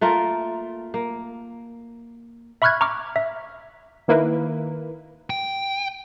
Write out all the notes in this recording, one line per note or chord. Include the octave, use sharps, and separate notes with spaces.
A3 A#3 F4 A#4
A#3
E5 B5 C#6 F6 F#6 G#6
A#5 C#6 D6 F6
E5
D#3 A#3 E4 B4
G5